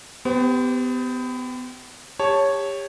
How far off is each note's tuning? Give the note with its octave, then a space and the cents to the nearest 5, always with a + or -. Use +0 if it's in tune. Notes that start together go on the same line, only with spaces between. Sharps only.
B3 +30 G4 +0 C5 +0
G4 +30 C#5 +0 A5 +0